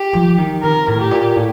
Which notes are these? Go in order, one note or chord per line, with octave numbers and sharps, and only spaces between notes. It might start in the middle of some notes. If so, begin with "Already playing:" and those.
Already playing: G4
F3
D#3
C3 A#4
A2
G4
A#2
A2